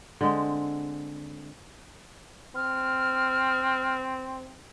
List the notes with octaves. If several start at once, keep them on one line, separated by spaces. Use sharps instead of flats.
D3 G#3 C4
C4 F6